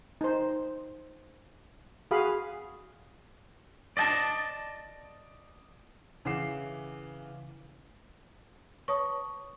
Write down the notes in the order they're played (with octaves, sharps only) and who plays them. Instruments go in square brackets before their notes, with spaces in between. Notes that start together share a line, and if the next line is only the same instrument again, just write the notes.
[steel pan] D#4 C5
F#4 G#4 F5 B5
[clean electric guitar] D5 D#5 G#5 A5
[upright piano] C#3 E3 F#5 D6 C7 E7
[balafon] B4 C#5 A5 [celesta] C#6 D#6